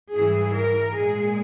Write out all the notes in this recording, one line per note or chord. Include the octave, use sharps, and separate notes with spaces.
G#2 E3 G3 G#4
A#4
A#2 G#3 G#4